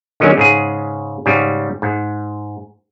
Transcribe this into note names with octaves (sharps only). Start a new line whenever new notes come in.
D3 D#3 F#3 G#3 C#4
G#2 C#3 G#4
G#2 C#3 G3
G#2